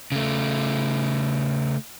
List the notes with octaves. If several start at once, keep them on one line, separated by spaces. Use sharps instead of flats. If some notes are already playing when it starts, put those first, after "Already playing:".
C#3 A3